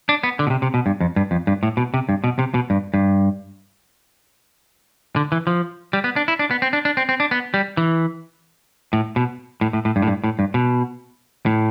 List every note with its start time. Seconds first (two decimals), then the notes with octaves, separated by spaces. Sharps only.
0.09 D4
0.23 B3
0.39 D3
0.47 B2
0.50 C3
0.62 C3
0.74 B2
0.86 G2
1.00 F2
1.16 G2
1.31 F2
1.47 G2
1.63 A2
1.77 B2
1.94 C3
2.09 G2
2.24 B2
2.39 C3
2.54 B2
2.70 G2
2.94 G2
5.16 D3
5.32 E3
5.47 F3
5.93 G3
6.04 B3
6.16 D4
6.28 E4
6.39 D4
6.51 B3
6.62 C4
6.73 D4
6.85 D4
6.97 C4
7.09 C4
7.20 D4
7.31 B3
7.54 G3
7.77 E3
8.93 A2
9.16 B2
9.61 A2
9.73 A2
9.85 A2
9.96 G2
10.02 A2
10.07 G2
10.24 A2
10.39 G2
10.54 B2
11.46 A2